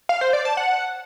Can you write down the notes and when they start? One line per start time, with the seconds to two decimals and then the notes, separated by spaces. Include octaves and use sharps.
0.09 F5
0.21 C5
0.33 D5
0.45 A5
0.57 F#5